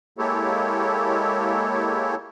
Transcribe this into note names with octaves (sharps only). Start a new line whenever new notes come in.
G#3 A#3 E4 G4 A4 C#5